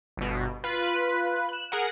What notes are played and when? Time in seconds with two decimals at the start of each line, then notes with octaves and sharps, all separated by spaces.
0.17 G1 B2
0.64 F4 B4
1.49 F#6 E7
1.72 G#4 A#4 F#5